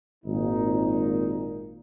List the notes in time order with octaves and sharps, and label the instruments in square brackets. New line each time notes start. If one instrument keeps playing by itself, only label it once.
[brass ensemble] G#1 A#2 D#4